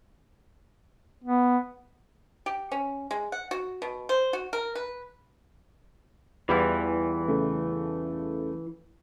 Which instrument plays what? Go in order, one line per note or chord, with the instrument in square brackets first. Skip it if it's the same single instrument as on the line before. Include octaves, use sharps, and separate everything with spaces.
[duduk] B3
[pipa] G4
C#4
G#3
F#5
F#4
B2
C5
F#4
A#4
B4
[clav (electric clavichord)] E2 G3 F4 [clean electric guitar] E3
[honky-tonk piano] C#3 A3